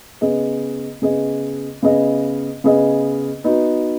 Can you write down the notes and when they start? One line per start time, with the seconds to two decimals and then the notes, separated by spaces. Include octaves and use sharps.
0.21 C#3 B3 G#4 D#5
1.02 C#3 B3 G#4 D#5
1.82 C#3 B3 G#4 D#5
2.64 C#3 B3 G#4 D#5
3.44 B3 D#4 F#4